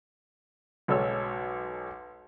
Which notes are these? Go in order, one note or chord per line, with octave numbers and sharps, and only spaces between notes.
B1 G#3 A4 C#5 E6